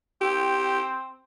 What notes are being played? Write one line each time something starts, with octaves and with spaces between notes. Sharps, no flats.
C4 G4